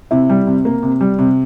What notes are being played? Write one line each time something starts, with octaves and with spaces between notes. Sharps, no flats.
C3 E4
G3
C3
A#3
C3
G3
C3